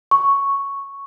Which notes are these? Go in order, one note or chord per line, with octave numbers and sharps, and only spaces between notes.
C#6